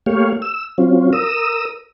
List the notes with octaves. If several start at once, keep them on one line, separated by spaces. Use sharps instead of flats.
A3 A#3 G4 C#5 F5
E6
F#3 C4 C#4 F4
A#4 D#6 E6